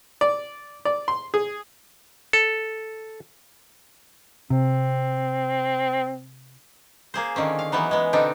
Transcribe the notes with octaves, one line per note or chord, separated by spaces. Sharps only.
D5
D5
C6
G#4
A4
C3 C4
A#3 G#4 C5
D3 D#3 C4 C#4
F5
E3 F#3 B3 D#4
G#3 B3
B2 D3 C4 D4 D#4